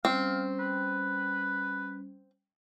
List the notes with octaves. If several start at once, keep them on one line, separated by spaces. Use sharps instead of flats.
G3 C4 C#4 F5
B4